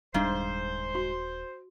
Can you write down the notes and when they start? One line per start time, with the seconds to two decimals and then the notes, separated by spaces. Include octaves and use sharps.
0.14 D#1 G#2 G3 D4 C5 F5
0.95 F#4 C6